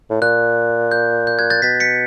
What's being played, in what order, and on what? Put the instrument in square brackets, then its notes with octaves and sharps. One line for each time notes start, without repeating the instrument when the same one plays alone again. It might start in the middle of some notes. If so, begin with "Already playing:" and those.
[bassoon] A2
[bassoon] A#2 [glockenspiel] F#6
[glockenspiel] G6
G6
F#6 G#6
G6 A6
[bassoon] B2 [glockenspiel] A6 B6
[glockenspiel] B6 C#7